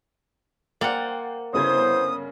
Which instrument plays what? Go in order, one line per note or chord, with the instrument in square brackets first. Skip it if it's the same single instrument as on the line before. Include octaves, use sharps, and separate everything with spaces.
[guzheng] A#3 F#5 [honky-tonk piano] C5 G5 A6
[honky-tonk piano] G1 C#3 G#6 [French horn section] B3 E4 C5 [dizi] D#6